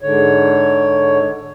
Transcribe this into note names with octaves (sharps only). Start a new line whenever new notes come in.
G#2 D3 C#5